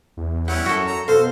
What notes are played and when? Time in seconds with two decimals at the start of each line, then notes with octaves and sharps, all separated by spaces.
0.17 E2
0.48 G3 C#4 E4 F#5
0.66 F#2 F#4 A4
0.87 A#5
1.08 B2 A4 C5 F5